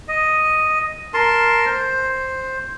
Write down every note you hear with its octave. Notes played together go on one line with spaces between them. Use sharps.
D#5
A#4 A5 C6
C5